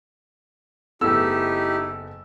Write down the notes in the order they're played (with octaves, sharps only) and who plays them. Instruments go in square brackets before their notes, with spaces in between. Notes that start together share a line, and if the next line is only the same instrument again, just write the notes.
[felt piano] F#1 A3 B3 [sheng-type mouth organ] D#4 E4 G4 [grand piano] E6